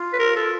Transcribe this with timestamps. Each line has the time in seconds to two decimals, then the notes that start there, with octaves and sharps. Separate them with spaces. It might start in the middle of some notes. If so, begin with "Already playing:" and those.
Already playing: F4
0.13 B4
0.19 A#4
0.36 A4